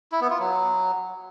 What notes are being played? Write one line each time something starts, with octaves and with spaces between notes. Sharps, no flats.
E4
B3
F4
F#3